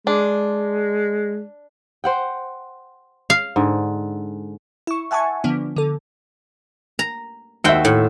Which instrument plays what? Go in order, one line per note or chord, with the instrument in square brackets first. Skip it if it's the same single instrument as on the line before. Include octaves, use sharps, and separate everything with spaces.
[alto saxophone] G#3 [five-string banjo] D4
[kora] C5 F#5 G5
[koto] F5
[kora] G#2 D3
[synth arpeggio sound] E4 C#6
E5 F#5 G#5 A5 C#6
D3 F3 B3 D4
D3 A4
[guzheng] A#5
[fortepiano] D#2 E5 [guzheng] F#4 C5 G5
[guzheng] A2